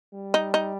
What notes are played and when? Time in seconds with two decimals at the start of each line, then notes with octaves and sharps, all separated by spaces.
0.14 G3
0.34 D#4
0.54 D#4